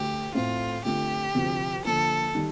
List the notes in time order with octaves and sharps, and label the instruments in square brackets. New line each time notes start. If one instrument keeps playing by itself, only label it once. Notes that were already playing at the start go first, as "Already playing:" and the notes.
Already playing: [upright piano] D2 A3 [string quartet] G4
[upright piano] A2 A3 C4 [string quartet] F4
[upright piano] D3 A3 C4 F4 [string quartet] G4
[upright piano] D2 C3 F3
[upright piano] D3 F3 A#3 F4 [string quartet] A4
[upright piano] D#3 G3